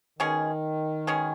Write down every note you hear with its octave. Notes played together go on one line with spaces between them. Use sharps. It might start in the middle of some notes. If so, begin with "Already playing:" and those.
B2 D#3 G#3 C#4 G#4
B2 G#3 C#4 G#4